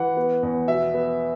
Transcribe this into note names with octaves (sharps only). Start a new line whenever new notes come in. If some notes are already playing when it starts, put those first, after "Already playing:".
Already playing: E3 F#5
B3
E2
B2 E5
B3